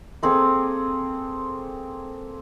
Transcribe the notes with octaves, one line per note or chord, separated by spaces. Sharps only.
A#3 C4 G#4 A4